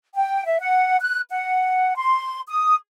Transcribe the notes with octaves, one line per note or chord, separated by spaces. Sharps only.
G5
E5
F#5
F#6
F#5
C6
D#6